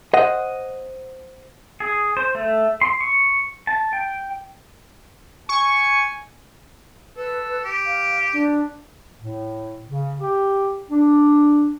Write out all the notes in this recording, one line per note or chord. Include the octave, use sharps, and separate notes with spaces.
C5 D#5 F#5
G#4
C5
A3
C6
C#6
A5
G5
G#5 C#6
A4 B4
G4
F5
D4
A2
C#3
G4
D4